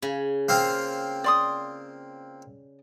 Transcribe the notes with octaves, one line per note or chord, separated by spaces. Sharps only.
C#3 G#5
A#3 C4 F4
D5 C6 D#6